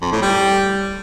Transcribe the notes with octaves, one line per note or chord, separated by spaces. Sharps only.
F2
A2
G3